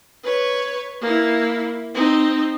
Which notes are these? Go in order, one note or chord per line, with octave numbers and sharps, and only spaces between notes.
B4 C#5
A#3 E4
C4 D#4